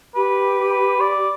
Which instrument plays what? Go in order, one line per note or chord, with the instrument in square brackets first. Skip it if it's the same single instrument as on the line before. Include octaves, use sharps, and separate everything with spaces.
[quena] G4 [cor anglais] B4
[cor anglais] B4
D5